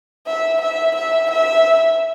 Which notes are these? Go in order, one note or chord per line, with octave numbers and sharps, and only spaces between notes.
E5
E5
E5
E5